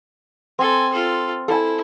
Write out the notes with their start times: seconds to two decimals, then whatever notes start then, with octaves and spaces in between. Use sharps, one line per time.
0.59 C4 A4 G#5
0.92 F4 A4
1.48 E4 A4 G#5